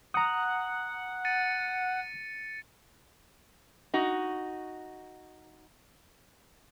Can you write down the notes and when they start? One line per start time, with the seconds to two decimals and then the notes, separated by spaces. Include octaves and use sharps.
0.14 F#5 A#5 D#6
1.25 A6 C#7 D#7
3.94 D#4 F#4